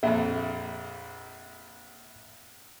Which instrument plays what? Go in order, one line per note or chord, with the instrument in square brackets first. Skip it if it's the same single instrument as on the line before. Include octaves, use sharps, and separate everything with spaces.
[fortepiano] A#1 F2 [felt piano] E5